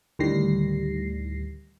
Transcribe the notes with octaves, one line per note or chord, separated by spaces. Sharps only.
D2 A2 D#3 G3 A#6 C7